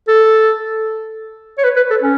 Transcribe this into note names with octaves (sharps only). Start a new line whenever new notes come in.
A4
C#5
B4
B4
A4
C#4